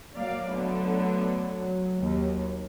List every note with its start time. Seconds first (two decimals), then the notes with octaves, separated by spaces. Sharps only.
0.16 F#3 A#3 D5 F5
0.49 D3 A3 B3
1.99 D#2